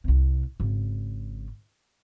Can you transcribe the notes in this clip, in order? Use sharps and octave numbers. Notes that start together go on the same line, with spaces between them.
C2 C3
G#1 C#3